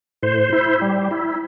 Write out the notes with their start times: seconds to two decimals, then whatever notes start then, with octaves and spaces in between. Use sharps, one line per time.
0.23 A2 C5
0.53 E4
0.82 G3
1.11 E4